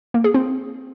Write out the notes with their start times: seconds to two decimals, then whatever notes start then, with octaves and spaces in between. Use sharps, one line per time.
0.14 A#3
0.24 G#4
0.34 C4